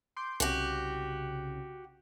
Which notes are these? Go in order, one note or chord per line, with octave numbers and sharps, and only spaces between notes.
C6 D6 G6
C2 C#3 F#4 G4